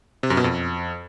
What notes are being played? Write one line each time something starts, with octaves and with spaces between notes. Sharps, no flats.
C3
F#2
B2
F2